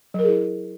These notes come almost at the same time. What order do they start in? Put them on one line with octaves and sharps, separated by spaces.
F#3 A#4 G#4 E4